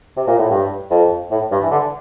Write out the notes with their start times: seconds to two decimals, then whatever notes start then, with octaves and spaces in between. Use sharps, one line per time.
0.16 C3
0.27 A#2
0.38 A2
0.50 G2
0.90 F2
1.31 A2
1.51 G2
1.62 E3
1.71 D3